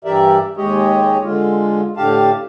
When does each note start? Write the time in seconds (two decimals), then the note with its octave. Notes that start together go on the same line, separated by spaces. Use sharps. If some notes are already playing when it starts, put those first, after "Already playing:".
0.04 G2 E3 G4 A#4 D5 E5
0.57 D#2 G#3 G4 C#5 D#5
1.23 D3 G#3 F4
1.97 A2 D3 G4 F5 A5